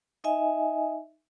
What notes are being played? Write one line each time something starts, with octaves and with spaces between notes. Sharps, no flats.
D#4 D#5 E5 G#5